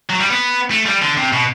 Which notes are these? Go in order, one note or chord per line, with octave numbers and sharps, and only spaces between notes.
F#3
G3
B3
A3
G3
D3
C3
B2